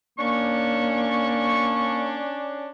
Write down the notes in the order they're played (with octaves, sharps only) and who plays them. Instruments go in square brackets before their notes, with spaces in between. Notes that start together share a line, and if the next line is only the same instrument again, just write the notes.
[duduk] A#3 [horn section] C#4 D4 [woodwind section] C#6